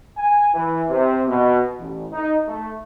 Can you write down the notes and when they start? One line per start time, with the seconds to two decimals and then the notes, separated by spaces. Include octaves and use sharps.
0.17 G#5
0.54 E3
0.89 C3
1.28 B2
1.78 A1
2.12 D#4
2.47 A3